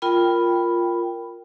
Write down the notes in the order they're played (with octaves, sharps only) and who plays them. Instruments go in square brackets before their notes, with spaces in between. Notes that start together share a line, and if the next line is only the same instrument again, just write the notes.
[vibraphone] F4 A#4 G5 B5